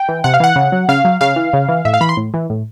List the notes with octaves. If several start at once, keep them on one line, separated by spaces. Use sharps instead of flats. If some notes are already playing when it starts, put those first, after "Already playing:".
Already playing: G5
E3
C3 F#5
F5
E3 F#5
C#3
F#3
C#3 F5
F#3
C#3 F5
E3
C#3
E3
A2 E5
F5
E3 B5
C6
A2
E3
A2